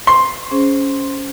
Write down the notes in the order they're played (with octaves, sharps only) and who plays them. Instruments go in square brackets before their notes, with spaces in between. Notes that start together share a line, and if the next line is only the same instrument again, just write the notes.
[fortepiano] C6
[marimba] C#4 G#4 C5